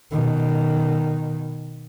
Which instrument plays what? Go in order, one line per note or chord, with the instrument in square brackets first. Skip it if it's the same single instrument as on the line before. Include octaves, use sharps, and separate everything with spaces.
[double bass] B2 D#3